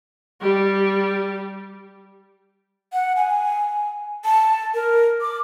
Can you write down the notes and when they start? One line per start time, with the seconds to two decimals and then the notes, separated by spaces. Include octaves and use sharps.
0.41 G3 G4
2.93 F#5
3.16 G#5
4.25 A5
4.74 A#4
5.21 D6